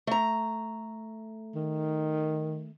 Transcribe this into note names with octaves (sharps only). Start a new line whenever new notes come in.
A3 A#5
D#3